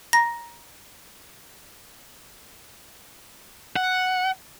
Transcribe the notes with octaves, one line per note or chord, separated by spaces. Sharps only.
A#5 A#6
F#5